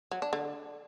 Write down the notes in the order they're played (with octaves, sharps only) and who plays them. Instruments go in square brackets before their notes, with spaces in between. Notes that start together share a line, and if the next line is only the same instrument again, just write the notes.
[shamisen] F#3
D4
D3